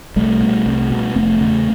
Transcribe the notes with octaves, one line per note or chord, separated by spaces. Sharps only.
C2 G3 A3
B2
C2
B2
F1 A3 B3
E2 C#3